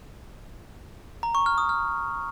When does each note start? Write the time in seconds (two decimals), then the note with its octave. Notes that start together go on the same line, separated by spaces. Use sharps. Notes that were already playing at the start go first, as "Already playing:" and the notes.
1.23 A#5
1.35 C#6
1.46 F6
1.58 D#6
1.69 F6